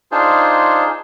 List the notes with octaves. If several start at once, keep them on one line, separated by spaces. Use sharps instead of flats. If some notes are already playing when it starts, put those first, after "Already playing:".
D4 D#4 F4 G#4 C5